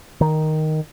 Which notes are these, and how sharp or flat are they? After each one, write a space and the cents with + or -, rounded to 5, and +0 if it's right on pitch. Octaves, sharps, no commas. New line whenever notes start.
D#3 +0